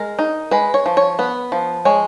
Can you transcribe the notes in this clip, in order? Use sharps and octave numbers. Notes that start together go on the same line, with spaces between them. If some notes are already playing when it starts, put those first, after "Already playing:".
Already playing: G#3 A#4
D#4
G#3 B4
C#5
F3
C#5
B3 B4
F3
G#3 C#5